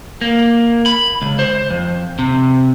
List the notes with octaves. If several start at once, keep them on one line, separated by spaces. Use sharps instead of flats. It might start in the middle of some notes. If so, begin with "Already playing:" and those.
A#3
B5
C#2
C5
F2
C3